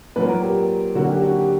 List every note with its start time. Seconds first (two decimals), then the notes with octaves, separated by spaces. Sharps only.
0.16 A#2 F#3 A#3 B4
0.29 A#4
0.42 G4
0.95 D3 F#3 A#3 F#4
1.09 G4
1.22 F#4
1.36 G4